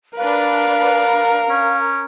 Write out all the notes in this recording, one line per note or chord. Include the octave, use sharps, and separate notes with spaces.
D4 A#4 B4 F5
C#4